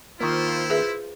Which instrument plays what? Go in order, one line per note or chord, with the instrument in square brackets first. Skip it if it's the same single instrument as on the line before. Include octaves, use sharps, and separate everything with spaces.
[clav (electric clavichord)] D#3 A#3 [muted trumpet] E4 [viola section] F4 C5
[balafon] G#4 B4 E5